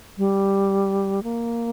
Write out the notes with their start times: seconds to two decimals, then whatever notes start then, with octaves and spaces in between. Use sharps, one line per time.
0.18 G3
1.23 A#3